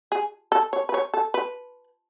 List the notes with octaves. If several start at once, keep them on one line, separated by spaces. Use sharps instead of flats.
G#4
A4
C#5
B4
C#5
A4
B4